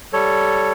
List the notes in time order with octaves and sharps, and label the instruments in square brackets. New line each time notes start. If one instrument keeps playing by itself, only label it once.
[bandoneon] G3 A4 C#5